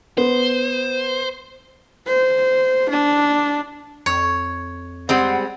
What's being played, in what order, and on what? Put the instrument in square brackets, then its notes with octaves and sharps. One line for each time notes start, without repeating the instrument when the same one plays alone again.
[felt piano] B3 [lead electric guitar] C5
[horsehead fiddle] C5
D4
[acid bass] F2 [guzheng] C#5
[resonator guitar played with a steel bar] G3 G#3 C4 [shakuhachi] F#5